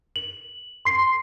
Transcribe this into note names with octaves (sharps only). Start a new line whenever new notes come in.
F#7
C6 C7